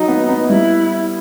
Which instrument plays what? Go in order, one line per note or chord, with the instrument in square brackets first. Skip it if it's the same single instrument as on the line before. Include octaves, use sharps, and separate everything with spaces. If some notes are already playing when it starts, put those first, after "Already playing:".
Already playing: [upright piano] F#3 [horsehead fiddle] D#4
[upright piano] B3
B3
[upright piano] G3 [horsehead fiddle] E4